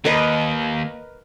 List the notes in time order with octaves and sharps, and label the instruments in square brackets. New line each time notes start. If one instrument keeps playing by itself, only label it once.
[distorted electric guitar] D#2 [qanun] A#4 B4 D#5